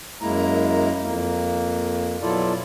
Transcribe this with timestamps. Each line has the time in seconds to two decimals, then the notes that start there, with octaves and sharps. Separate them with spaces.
0.22 F#2 G#3 A#3 E4 A#5
1.01 F2 A#3
2.22 B2 F#3 E4 F4 A4 D5